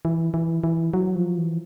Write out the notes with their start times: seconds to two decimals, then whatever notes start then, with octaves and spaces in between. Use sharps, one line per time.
0.05 E3
0.34 E3
0.64 E3
0.94 F#3
1.15 F3
1.38 E3